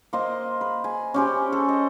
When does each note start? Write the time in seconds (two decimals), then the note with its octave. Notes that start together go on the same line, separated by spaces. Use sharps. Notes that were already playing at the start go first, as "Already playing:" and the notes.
0.13 A#3 C5 D#5
0.61 B4
0.84 G#5
1.14 C#4 G4 C5
1.52 A4
1.69 D#5